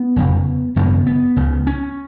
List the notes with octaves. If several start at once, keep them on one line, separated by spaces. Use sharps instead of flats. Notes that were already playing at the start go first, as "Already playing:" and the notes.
Already playing: B3
F1 F2 C#3
G#1 F#2 C#3 B3
B3
C#2 C#3
C#4